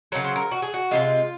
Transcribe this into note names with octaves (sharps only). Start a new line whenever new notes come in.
C#3 F#3 A#4
C5
A#4
F#4
G#4
F#4
C3 D#3 G#3 F4